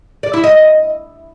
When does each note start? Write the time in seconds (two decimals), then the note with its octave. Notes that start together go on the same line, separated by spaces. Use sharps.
0.23 D5
0.33 E4
0.44 D#5